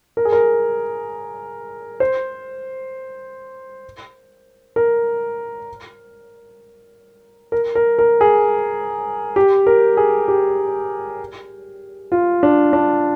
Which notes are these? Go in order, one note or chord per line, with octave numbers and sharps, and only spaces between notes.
A#4
G#4
A#4
C5
A#4
A#4
A#4
A#4
G#4
G4
A#4
G#4
G4
F4
D4
D4